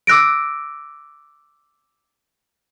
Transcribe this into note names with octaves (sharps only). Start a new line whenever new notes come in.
D6 E6 F#6 A#6 D7